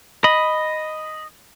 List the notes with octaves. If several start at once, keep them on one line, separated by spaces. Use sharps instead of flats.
D#5 B5